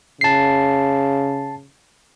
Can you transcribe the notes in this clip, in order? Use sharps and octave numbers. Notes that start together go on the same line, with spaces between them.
C#3 A5 C7